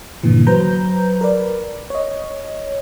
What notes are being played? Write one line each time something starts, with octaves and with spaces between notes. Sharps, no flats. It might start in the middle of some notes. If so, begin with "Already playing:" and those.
G2 A#2 D3 E3
F#3 B4 C5 A#5 G6
A#4 B4 D5
C#5 D#5